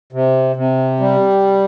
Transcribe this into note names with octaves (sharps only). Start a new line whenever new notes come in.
C3
C3
G3